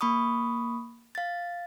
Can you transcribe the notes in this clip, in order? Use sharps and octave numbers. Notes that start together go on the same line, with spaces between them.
A#3 B5 C#6 D#6
F5 A6